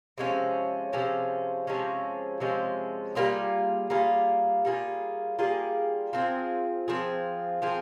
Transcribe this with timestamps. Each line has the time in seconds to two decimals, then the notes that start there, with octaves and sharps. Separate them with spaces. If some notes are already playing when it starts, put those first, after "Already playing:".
0.18 C3 F3 G#3 C#4
0.93 C3 F3 G#3 C#4
1.67 C3 F3 G#3 C#4
2.40 C3 F3 G#3 C#4
3.15 G3 A#3 F4 G#4
3.90 G3 A#3 F4 G#4
4.65 G3 A#3 F4 G#4
5.39 G3 A#3 F4 G#4
6.13 F3 C4 F4 G#4
6.88 F3 C4 F4 G#4
7.62 F3 C4 F4 G#4